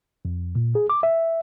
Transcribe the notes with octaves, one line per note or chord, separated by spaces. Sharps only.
F2
A#2
G#4
D6
E5